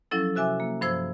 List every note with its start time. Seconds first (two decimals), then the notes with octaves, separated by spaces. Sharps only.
0.11 F3 F#3 C#4 E4 A4
0.36 C3 F#4 E5 G#5 D6
0.60 A#3
0.81 G2 F3 C5 E6 G#6